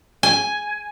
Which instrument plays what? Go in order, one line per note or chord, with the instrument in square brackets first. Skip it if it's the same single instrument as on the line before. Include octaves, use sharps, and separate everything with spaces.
[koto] G#5